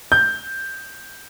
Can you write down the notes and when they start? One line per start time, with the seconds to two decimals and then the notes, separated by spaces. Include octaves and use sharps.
0.12 G6